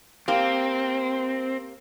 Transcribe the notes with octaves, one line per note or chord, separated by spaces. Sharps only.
A#3 C4 G4